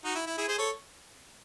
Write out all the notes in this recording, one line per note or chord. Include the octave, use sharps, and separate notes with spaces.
D#4 F#4
E4
E4
E4 G#4
G#4 C5
A4 C#5